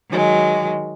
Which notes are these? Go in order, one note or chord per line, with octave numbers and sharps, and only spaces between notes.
D#3 F#3 G#3